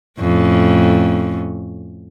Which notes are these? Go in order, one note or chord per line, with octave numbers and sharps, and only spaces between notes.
F2 A2 C#4